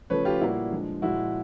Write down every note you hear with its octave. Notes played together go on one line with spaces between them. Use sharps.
C#3 F3 A3 B4 C#5
F4 G4
A#2 G3 A#3 E4 F#4
D3 F3 G#3
A#2 F3 G#3 E4 F#4